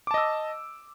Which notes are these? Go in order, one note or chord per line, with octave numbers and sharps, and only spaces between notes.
D#5 A5 D6 E6